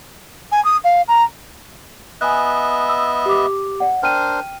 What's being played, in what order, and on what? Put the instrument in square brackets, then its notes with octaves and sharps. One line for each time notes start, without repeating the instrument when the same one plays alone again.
[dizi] G#5
D#6
F5
A#5
[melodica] B3 D#5 E5 [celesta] G#5 F#6
[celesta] E6
G4 D6
D5 F#5
[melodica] D4 A#4 C5 [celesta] G5 F6 D#7